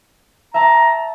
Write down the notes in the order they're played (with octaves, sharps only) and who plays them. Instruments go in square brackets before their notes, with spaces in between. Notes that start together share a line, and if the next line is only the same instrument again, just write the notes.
[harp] E5 A5 [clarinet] A#5